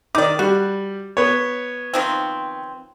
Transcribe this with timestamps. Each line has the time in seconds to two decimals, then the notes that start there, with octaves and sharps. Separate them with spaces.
0.15 D#3 D#4 D5 D6
0.39 G3 F#4
1.17 B3 C#5
1.94 D#3 F3 C4